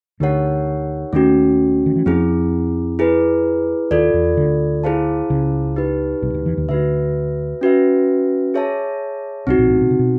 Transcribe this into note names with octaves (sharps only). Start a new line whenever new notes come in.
D2 D3 D#4 G4 A#4 C#5 F#5
D#2 D#3 A3 C#4 F#4
D#3
E3
F2 F3 C4 E4 G#4
E4 G#4 B4
D#2 D#3 F4 A4 D5
E2 E3
D2 D3
E4 G#4 C5 F5 A5
C#2 C#3
D#4 G4 B4
C2 C3
D2 D3
E2 E3
D#2 D#3
D2 D3 F#4 B4 E5
C#4 F#4 B4 E5
G#4 C#5 E5 A5
C2 C3 C4 D#4 F#4
A#1 A#2
A1 A2
B2
C3
B2